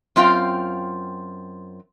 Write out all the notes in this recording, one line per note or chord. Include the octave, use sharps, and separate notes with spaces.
F#2 C4 F4 F5 G5